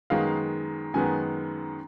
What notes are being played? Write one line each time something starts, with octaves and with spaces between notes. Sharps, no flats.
F#2 D#3 G#3 B3 F5
F#2 D#3 G#3 B3 G#5